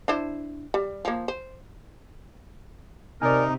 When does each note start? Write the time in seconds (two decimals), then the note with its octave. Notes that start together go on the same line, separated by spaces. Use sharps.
0.08 D4 E4 C5
0.74 G3
1.05 F3 A#3
1.28 C5
3.22 C3 D#4 A#4 D5 G#5